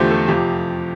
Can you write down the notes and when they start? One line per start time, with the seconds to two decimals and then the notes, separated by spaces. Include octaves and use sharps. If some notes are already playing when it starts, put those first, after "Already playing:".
Already playing: E2 D3 F3 A3 G4 C5
0.11 A4
0.28 F2 C3 F3 G4